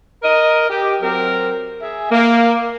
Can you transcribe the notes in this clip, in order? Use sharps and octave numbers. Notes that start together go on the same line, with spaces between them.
A#4 D#5
G4
F#3 C4 A#4
G#4 E5
A#3